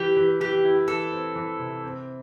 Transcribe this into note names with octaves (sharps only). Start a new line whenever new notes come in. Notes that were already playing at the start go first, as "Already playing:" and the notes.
Already playing: E3 G4
E3
E3 G4
E4
E3 A4
C4
E3
C3
C4